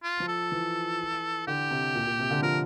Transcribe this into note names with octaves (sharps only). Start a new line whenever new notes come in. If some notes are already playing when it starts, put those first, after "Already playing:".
F4
F3
A4
E3
D3 G4
C3
A#2
A#2
C3
D3
F3 A#4